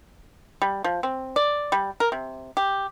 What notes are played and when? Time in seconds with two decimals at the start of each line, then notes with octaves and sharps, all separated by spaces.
0.62 G3
0.84 F3
1.03 C4
1.36 D5
1.72 G3
2.00 A#4
2.12 C3
2.57 G4